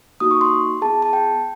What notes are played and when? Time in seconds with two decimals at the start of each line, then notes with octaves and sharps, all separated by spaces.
0.20 A#3 D#4 F#4 D#6
0.31 C#6
0.41 C6
0.82 B3 E4 G#4 A5
1.02 A5
1.13 G5